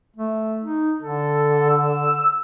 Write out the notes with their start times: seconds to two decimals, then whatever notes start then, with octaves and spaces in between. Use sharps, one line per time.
0.16 A3
0.64 D#4
1.02 D3 A4
1.70 E6